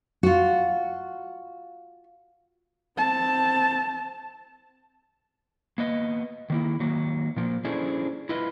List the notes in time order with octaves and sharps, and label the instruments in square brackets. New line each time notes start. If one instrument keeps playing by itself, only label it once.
[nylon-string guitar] F4 F#4
[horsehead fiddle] C4 A5
[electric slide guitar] A#3 B3 D#5
D#3 A#3 E4
D#3 F#3 A#3
A#2 F3 A#3
C#4 D4 E4 G#4 A4 C5
E4 F4 B4 D#5